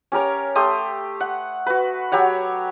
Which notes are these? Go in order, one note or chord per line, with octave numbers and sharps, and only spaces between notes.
C#4 G4 A#4 C#5
A3 G4 C6 D#6
F#5
F#4 B4
F#3 G4 C#5 F#5